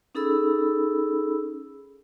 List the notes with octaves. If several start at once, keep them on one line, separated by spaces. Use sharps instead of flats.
C#4 D#4 G#4 A4 B5 E6